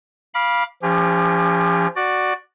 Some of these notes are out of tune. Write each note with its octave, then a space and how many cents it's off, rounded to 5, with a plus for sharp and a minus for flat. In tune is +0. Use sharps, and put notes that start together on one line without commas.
F5 +0 B5 -25 D6 +0
F3 -30 C#4 +25 G4 +45
F#4 +0 D5 +10